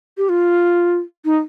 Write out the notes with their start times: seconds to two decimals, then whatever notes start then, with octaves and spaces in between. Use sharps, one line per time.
0.17 G4
0.29 F4
1.25 D#4